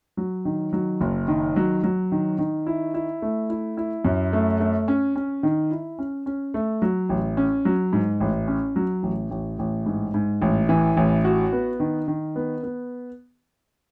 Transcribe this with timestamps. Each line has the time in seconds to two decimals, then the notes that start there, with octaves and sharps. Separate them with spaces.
0.17 F#3
0.45 D#3
0.73 F#3
1.01 F#1
1.28 D#3
1.56 F#3
1.83 F#3
2.12 D#3
2.38 D#3
2.66 E4
2.94 E4
3.22 A3
3.50 E4
3.77 E4
4.05 F#2
4.33 A3
4.60 A3
4.88 C#4
5.16 C#4
5.43 D#3
5.71 E4
5.99 C#4
6.26 C#4
6.54 A3
6.82 F#3
7.09 A1
7.37 C#4
7.65 F#3
7.93 G#2
8.20 A1
8.48 C#4
8.76 F#3
9.03 A1
9.31 A1
9.59 A1
9.86 G#2
10.14 G#2
10.42 A1
10.69 E3
10.97 A1
11.24 F#4
11.53 B3
11.80 D#3
12.08 D#3
12.36 B3
12.63 B3